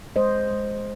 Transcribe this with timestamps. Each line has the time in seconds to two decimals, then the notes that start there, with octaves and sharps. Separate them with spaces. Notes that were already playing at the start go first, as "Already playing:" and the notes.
0.16 G#3 C5 D#5
0.51 G#3